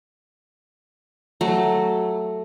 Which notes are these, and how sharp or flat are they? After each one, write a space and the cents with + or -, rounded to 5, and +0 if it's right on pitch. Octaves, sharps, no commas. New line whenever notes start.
F#3 +0 A3 +0